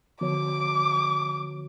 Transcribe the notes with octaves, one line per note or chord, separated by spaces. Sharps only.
D3 F3 B3 F#4 C#5 D6